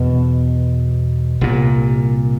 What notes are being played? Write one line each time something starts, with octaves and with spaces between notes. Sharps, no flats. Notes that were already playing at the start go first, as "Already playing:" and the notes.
Already playing: E2 B2
C2 A#2